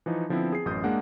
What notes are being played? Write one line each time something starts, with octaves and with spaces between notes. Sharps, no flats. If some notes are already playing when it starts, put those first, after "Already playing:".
E3 F3 D#4
D3 F3 B3 C4 E4
G#4 C7
A1 F#2 D#6 G6
G#3 A#3 D4 F#5